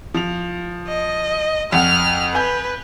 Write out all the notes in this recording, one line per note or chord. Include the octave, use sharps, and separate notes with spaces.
F3 F7
D#5
F2 F#5 F6
B4 G#5 G6